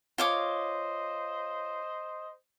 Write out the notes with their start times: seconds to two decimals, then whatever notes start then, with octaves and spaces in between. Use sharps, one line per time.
0.18 F4 C5 C#5 D#5 D6